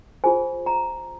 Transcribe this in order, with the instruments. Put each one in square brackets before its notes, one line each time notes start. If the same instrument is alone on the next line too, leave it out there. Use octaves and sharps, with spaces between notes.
[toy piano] F4 G#4 C5 G#5
A#5